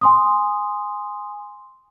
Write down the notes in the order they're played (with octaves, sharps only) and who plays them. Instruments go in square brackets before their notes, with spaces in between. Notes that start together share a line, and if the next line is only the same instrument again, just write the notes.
[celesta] G#5 C6 D#6